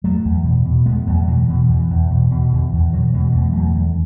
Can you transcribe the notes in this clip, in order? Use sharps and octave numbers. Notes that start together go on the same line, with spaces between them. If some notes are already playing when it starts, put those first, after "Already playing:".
E2 F#3 A3
E2
B2
B2
E2 G#3 B3
E2 F#3 A3
B2 E3 G#3
B2 E3
E2 E3
E2
B2
B2
E2 D3
E2 E3
B2 D3 F#3
B2 E3 G#3
E2 A3
G#3
E2 F#3 A3
D3